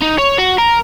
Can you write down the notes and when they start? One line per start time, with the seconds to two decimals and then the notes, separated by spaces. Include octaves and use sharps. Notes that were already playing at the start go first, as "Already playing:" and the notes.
0.02 D#4
0.18 C#5
0.38 F#4
0.58 A#4